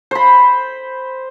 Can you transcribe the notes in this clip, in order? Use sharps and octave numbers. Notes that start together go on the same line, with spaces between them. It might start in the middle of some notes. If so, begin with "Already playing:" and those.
C5 B5